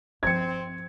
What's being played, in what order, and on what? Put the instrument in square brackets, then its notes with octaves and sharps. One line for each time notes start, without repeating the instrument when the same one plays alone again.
[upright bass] G2 F3 [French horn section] C4 [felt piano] G#6 C#7